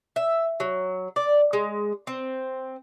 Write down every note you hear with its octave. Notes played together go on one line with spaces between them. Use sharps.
E5
F#3
D5
G#3
C4